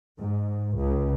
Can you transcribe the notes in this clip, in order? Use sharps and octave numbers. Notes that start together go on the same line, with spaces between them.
G#2
C#2